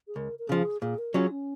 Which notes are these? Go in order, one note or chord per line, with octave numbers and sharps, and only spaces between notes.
G#4
C#2 A#4
A#4
C#3 F3 G#4
A#2 G#4
A#4
F#3 C#4 F4 G#4
C#4